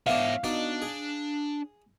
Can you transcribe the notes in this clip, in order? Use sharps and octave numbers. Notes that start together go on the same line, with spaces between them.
E3 B3 D4 C#5 E5 F5
B2 D4 D#4 D6
G#4